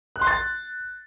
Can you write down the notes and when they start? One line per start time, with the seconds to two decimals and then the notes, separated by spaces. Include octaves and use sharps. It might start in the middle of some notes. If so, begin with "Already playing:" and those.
0.16 F#6
0.21 C6
0.27 A6